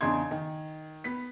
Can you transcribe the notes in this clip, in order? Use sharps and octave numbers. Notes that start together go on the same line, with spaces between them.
E2 C#3 D4 D#4 C6 G#6
D#3
B3 B6